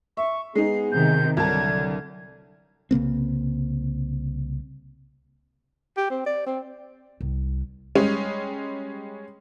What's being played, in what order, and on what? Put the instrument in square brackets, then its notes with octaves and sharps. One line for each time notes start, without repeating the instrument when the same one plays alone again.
[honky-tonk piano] E5 [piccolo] C#6
[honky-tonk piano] G#3 D#4 [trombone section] B3 G#4 [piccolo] C7
[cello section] C3 D#3 [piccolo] G6
[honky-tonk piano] C2 A#4 A5 [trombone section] D3 [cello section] F#3 [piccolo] G#6
[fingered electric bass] C2 C#3 A#3 C4
[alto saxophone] G4
C4
D5
C4
[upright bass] C2
[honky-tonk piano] G3 G#3 C#4